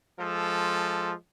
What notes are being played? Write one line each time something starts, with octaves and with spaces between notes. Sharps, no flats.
F3 G#3 A4